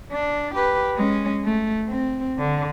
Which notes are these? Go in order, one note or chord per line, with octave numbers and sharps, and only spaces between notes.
D4
G4 B4
G#3 C#4
A3
C4
D3